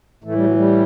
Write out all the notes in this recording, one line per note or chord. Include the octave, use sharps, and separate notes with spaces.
A2 E3 A3
G3
F#3
G3